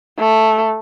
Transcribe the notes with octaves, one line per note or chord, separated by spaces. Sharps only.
A3